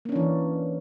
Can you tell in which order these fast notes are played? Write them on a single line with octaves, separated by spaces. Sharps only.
A#3 C#4 D4 E3